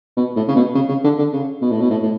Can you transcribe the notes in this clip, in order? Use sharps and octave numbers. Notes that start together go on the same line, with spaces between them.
B2
A2
C#3
B2
C#3
C#3
D3
D3
C#3
B2
A2
B2
A2
A2